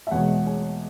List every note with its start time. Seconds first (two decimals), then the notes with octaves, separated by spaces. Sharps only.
0.07 E5
0.11 E2 B2 G#3 C#5 F#5
0.46 G#4 C#5